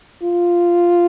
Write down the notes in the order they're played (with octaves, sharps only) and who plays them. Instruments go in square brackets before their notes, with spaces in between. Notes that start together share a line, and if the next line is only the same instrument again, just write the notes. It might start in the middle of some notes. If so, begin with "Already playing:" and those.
[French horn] F4